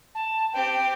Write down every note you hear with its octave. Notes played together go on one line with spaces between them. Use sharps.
A5
C4 G4 G5